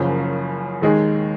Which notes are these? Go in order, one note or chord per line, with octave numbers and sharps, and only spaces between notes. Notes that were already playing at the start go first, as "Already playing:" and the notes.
Already playing: F#1 F#2 C#3 F3
D#2 D#3 G#3 D#4 G#4